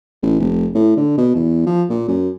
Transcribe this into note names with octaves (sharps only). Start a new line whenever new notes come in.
A1
F1
A2
D3
B2
E2
F3
A#2
F#2